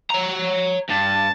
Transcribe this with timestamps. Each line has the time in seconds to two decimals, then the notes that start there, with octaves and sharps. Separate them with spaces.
0.10 C#5 A#5
0.90 G2 A5